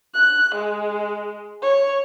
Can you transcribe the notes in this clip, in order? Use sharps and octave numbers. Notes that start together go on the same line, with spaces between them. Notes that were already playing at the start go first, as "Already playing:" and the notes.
F#6
G#3
C#5